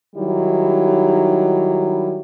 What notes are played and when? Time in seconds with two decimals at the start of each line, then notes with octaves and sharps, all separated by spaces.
0.16 D#3 F#3 G3 D#4 E4